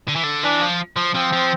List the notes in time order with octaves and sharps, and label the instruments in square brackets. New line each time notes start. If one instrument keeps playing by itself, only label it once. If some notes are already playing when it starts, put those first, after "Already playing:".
[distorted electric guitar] D3
E3
D3
[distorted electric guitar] E3 [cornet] D4
[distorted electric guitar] F3
F3
[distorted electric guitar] F3 [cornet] C4
[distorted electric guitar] F3